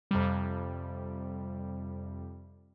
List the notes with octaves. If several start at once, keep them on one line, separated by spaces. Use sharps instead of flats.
F2 C3 G3